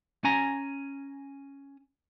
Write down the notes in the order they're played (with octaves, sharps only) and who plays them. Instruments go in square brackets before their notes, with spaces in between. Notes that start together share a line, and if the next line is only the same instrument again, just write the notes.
[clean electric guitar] C#4 G#5 A#5